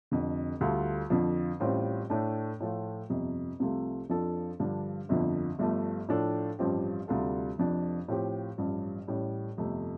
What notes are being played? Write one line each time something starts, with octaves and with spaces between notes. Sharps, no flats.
F1 F2 D3
D2 D3 G3 F4 A4
F2 D3 F3
A1 A2 G3 C4 F4
A2 A3 D4
A2 F3 A3 F4
G1 F2 C3
C2 C3 F3 A3 F4
F2 F3 D4 A4
G2 D3 F3 D4
G1 F2 D3 F3
G1 G2 F3 A3
A2 F3 D4 A4
A1 G2 F3 C4 G4
D2 C3 G3 F4 A4
F1 F2 F3 D4
A2 F3 C4 G4
A1 G2 F3
A1 A2 G3
G1 F2 C3 A3